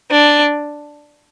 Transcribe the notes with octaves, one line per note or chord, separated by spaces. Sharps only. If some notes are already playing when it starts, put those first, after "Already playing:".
D4